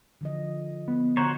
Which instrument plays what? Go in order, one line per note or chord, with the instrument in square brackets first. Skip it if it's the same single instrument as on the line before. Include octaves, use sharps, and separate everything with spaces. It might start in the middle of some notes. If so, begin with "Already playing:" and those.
[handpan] D3 F3 D#5
[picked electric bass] B3
[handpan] D3 [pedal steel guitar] F#4 C5 C#5 [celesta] A#5